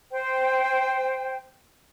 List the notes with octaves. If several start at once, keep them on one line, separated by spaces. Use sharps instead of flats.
C5 G5